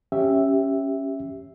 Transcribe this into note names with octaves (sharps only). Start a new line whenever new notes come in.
C#4 G4 E5